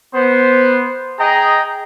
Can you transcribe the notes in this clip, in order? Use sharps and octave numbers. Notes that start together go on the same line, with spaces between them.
B3 C5
G#4 D#5 G5 A#5